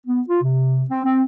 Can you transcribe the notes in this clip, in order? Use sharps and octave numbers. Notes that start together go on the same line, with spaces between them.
B3
F4
C3
C4
C4